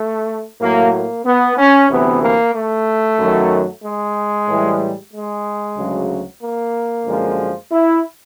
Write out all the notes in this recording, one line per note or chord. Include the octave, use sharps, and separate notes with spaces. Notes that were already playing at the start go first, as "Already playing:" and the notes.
Already playing: A3
A2 F#3 A#3
A#3
B3
C#4
D2 C3 E3 B3
A#3
A3
F#2 D#3 F#3
G#3
A2 E3 G3
G#3
D2 C#3 F#3
A#3
F#2 D3 F3 G#3
E4